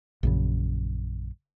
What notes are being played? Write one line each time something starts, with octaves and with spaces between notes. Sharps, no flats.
A#1 F#2 C#3